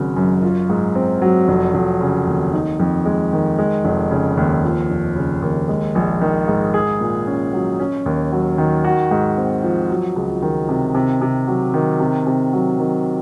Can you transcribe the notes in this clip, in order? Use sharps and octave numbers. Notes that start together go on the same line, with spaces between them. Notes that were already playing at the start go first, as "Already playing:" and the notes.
Already playing: G#1 C#3 F#3
F#2
F4
G#2
C4
F#3
F1
F1
C#3
D#2
D#4
F2
G#3
D#3
G#3
F1
C#3
D#2
F3
F1
C#3
D#2
G#3
A#1
D#3
G#2
G#4
A#2
C#4
F#3
C#4
D#2
F#3
D#3
F#4
G#2
C4
F3
F#3
C#2
D#3
C3
C3
C3
F#3
D#3
C3
C3
F#3
D#3